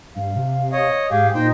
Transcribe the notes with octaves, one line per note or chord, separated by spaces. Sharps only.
G2 F5
C3
C#5 D#5
G#2 G4 G#4 F5
A#2 D#4 C5 G5